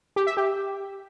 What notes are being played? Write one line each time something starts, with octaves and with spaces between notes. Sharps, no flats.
G4
E5
G4